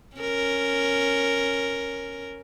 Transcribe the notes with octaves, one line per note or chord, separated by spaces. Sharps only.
C#4 A#4